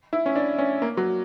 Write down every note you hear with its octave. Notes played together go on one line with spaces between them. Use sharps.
E4
C#4
D4
C#4
A#3
F#3